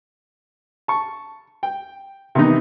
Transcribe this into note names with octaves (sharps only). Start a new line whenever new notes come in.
A5 C#6
G5
C3 D#3 E3 B3 D#4